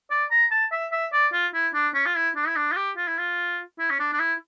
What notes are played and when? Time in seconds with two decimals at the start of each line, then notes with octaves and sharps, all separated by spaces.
0.11 D5
0.31 A#5
0.51 A5
0.72 E5
0.92 E5
1.13 D5
1.33 F4
1.54 E4
1.74 D4
1.95 C#4
2.06 F4
2.16 E4
2.36 D4
2.47 E4
2.56 D4
2.72 F4
2.77 G4
2.97 F4
3.08 E4
3.18 F4
3.79 E4
3.90 C#4
3.99 D4
4.13 D4
4.20 E4